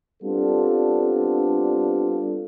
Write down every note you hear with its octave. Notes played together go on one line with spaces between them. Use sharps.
G3 B3 C4 D4 F4 A4